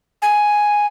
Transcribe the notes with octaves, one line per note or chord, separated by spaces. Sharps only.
G#5